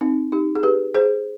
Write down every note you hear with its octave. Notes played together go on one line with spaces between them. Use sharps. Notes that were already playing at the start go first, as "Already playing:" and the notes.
C4 D#4
D#4 G4
G#4
G4 B4
G#4 C5